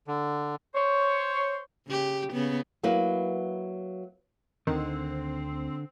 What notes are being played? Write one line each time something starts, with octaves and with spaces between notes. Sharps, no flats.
D3
C5 C#5
C#3 G4
C#3 B3
F#3 A#3 E4 B4
D2 D3 D#3 C4